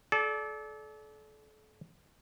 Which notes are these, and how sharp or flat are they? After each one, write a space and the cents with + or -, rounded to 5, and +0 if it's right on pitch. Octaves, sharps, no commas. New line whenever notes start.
A4 -35 D5 -10